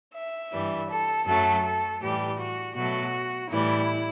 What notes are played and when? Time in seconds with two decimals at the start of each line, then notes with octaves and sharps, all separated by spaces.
0.15 E5
0.52 G2 E3 G3
0.90 A4
1.26 F#2 F#3 A3 A4
1.64 A4
2.01 A2 E3 G3 G4
2.39 F#4
2.76 B2 F#3 A3 F#4
3.51 A2 E3 G3 E4